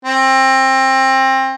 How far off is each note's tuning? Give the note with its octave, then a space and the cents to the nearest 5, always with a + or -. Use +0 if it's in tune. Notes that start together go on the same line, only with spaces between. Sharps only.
C4 +25